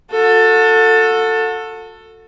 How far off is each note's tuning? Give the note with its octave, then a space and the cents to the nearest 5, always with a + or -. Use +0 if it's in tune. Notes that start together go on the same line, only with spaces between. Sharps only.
F#4 -30 A4 +15